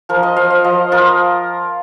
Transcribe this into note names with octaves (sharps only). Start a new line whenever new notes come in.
F3 A#4
D#5
F3 F5
F5
F3 D#5
F4 A#4